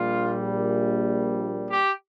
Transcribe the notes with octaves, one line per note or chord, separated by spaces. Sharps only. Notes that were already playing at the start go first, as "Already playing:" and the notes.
Already playing: A#1 A#2 G3 F4
G4